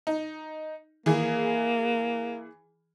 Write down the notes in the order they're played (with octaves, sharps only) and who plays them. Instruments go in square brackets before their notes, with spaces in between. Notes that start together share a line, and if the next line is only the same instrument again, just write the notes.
[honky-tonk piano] D#4
[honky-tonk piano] E3 G#4 [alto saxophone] A#3